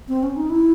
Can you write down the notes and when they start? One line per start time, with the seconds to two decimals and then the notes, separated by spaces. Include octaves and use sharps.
0.08 C4
0.23 C#4
0.36 D#4
0.50 E4